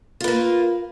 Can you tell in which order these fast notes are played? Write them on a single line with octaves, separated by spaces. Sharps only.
F4 B4 A#3